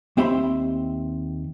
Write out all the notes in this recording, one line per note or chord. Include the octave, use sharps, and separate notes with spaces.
D#2 C4 G4 E5 B5 C6